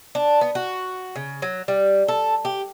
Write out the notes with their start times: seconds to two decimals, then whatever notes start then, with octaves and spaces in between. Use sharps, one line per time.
0.15 D4
0.41 B3
0.55 F#4
1.16 C#3
1.42 F#3
1.68 G3
2.08 A4
2.45 G4